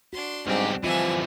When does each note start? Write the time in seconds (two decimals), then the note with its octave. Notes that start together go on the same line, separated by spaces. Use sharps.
0.13 D4 F#4 C6
0.47 B1 G#2 G3 C4 D4 G4
0.84 D3 E3 F3 C4 F4 D#5 E5 G#5